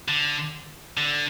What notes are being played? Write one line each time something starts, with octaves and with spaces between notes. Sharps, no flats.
D3
D3